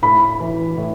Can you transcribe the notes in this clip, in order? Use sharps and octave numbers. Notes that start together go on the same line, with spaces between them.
A2 B5
E3
A2